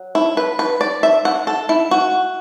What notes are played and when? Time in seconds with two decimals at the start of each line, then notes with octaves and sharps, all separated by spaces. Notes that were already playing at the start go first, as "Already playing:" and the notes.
Already playing: F#3
0.15 E4
0.37 B4
0.59 B4
0.81 D5
1.03 E5
1.25 F#5
1.47 A4
1.69 E4
1.91 F#4